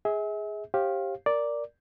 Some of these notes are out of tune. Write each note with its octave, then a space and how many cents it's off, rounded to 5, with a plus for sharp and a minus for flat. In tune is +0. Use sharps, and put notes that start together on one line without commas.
G#4 +0 E5 -40
G4 +0 C5 +40 F5 +0
A#4 +0 D5 -5